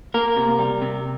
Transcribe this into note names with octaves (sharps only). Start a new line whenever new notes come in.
A#3 A#4
C3
G3
C3